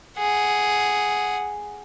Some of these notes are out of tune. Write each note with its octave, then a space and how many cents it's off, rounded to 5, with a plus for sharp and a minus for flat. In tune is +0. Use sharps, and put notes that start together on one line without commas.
G#4 +0 F#5 +0